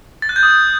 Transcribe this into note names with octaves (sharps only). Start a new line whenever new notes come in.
A6
F#6
G6
D#6